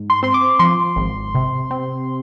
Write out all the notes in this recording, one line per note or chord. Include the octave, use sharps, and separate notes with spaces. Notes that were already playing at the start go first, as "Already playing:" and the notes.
Already playing: G#2
C6
C4 C6
D6
F3 C6
G#1
C3
C4